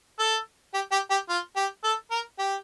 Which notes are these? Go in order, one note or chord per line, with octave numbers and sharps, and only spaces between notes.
A4
G4
G4
G4
F4
G4
A4
A#4
G4